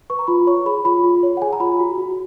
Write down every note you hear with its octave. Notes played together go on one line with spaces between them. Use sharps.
B4 C#6
A#5
F4 B5
C#5 C#6
G#4 B5
F4 B5
F4
C#5
F#5
G#4 G#5
A#5
F4 B5
F#4
F#4